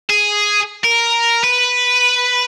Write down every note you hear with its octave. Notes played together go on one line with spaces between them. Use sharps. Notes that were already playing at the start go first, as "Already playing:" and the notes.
G#4
A#4
B4